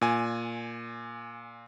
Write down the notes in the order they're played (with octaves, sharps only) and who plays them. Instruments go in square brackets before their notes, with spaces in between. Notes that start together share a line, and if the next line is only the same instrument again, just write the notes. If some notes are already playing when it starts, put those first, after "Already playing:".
[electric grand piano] A#2 G#5